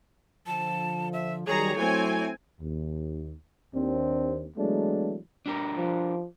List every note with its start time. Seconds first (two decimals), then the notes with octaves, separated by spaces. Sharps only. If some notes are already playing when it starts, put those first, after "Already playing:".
0.47 D3 F3 A5
1.13 E5
1.47 D#3 F#3 G3 G#4 C#5 A#5
1.76 F#3 A3 C4 E4 G#5
2.60 D#2
3.74 D#2 C4 D4
4.57 E3 F#3 G#3 A3 B3 D4
5.46 D4 G4 A#4
5.77 F3